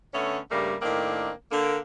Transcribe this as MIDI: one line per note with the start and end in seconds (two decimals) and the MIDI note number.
0.13 0.38 50
0.13 0.38 57
0.13 0.38 59
0.13 0.38 61
0.51 0.76 43
0.51 0.76 49
0.51 0.76 55
0.51 0.76 57
0.51 0.76 58
0.82 1.30 45
0.82 1.30 51
0.82 1.30 58
0.82 1.30 60
0.82 1.30 62
1.51 1.78 50
1.51 1.78 58